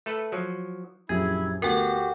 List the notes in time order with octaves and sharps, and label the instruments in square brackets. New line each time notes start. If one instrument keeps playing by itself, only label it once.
[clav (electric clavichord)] A3 A4 B4
F3 F#3
[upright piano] A#1 F#2 G4 [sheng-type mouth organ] E4 [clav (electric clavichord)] G#4 [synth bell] G#6
[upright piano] D2 [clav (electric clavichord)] B3 [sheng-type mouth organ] F#4 G4 [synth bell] A#4 G5